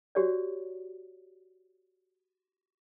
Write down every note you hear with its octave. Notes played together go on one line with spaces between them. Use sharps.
F#4 G4 C#5 D5